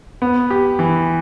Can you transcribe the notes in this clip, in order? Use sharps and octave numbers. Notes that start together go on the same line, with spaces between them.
B3
G4
E3